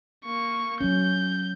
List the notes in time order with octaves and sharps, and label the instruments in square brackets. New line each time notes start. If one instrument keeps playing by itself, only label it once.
[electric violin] A#3 C#6
[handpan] F#3 C#4 [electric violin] G6